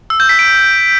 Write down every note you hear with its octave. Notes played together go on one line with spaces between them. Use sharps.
E6
G6
B6
D7